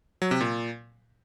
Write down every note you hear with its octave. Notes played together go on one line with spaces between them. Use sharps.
F#3
C3
A#2